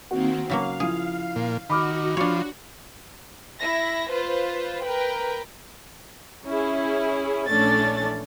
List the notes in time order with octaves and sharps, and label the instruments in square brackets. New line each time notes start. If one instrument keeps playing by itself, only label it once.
[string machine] D#3 A#3 C4 [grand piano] F#4
[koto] C#3 F#3 A#3 [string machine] F5
[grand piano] F3 E4 [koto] G#4
[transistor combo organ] A#2
[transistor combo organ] D#3 [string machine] F#4 [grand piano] B5 D6 F6
[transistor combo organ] F3 [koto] D4 C#5
[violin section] E4 E5 A#6
F4 B4 C5
A#4 B4 G5
[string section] C#4 E4 G#4
A#1 E3 A3 C#4 D4 A6